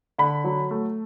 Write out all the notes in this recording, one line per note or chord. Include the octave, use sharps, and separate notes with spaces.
D3 B5
F#3
A3